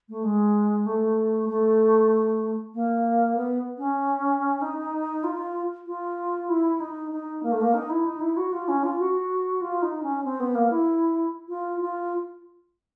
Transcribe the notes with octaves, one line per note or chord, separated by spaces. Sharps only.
A3
G#3
A3
A3
A#3
B3
C#4
D#4
F4
F4
E4
D#4
D#4
A#3
A3
A#3
D#4
E4
D#4
E4
F#4
F4
C#4
F4
F#4
F4
D#4
C#4
C4
B3
A#3
E4
F4
F4